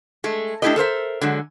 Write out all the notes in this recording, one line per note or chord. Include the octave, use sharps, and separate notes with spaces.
G#3 A3
A3 D4 E4 G4 A4 D#5
A4 A#4 C5 E5
D3 F#3 G#3